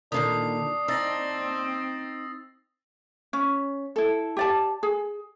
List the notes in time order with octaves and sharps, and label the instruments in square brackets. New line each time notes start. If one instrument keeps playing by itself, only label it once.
[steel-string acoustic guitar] A#2 D3 D#3 [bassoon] D4 [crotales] D#6 C7
[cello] C4 [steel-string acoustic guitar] D#4 [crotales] E6 A6 A#6
[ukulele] C#4
E4 A4
G4 D5 A5
G#4